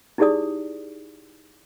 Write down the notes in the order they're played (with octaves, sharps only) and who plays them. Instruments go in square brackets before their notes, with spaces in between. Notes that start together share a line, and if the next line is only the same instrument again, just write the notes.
[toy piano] D#4 E4 G4 G#4 D5 D#6